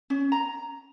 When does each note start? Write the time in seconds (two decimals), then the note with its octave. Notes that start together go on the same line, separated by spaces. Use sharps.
0.10 C#4
0.32 A#5